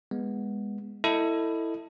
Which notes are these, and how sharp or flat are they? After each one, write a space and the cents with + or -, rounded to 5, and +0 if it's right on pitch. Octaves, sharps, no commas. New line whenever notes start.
G#3 -20 B3 -10
E4 +0 A4 +20 D#5 -5